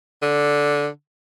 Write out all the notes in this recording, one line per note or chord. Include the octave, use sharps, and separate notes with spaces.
D3